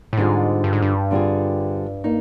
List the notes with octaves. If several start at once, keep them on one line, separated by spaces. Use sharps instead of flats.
A2
G#2 D3 G3 C4 F4 G#4
G2
G#2
G2
D3 G3 C4 F4 G#4
A#3 D#4